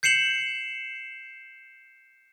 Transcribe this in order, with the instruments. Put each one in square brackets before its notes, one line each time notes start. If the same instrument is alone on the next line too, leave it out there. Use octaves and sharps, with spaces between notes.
[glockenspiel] G6 C7 C#7 E7 F#7